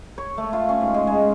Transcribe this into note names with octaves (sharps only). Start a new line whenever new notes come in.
C#5
A3
F4
C#4
G#2
G#3
G#3